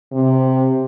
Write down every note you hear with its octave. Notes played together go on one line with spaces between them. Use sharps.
C3